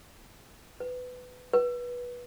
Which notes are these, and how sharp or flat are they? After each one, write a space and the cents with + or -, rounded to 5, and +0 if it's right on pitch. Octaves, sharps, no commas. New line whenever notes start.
B4 +20
B4 -20